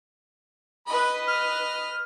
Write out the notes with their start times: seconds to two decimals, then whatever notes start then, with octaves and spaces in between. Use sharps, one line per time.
0.87 B4 D#5 B5
1.28 F6